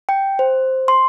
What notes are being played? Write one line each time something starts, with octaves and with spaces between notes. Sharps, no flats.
G5
C5
C6